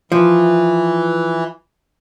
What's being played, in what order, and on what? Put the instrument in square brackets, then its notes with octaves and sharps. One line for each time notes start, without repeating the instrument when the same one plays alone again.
[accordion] E3 [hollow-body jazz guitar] F3